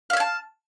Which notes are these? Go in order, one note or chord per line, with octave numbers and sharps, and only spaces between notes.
E5 F5 G#5 A5